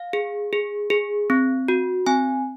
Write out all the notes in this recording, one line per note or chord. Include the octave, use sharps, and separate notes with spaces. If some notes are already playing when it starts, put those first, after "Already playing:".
Already playing: F5
G#4
G#4
G#4
C4
F#4
C4 G#5